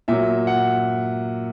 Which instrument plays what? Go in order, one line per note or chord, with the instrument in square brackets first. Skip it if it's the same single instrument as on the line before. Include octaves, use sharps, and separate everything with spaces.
[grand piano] A#2 F#3 E5
F#5